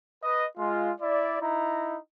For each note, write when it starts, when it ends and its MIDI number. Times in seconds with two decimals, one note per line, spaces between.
0.22 0.44 71
0.22 0.44 75
0.57 0.90 56
0.57 0.90 65
1.01 1.37 64
1.01 1.37 74
1.40 1.97 63
1.40 1.97 64
1.40 1.97 82